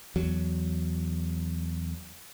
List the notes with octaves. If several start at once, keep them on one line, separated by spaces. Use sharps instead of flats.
E2 F#3